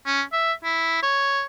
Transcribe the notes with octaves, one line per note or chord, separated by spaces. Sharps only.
C#4
E5
E4
C#5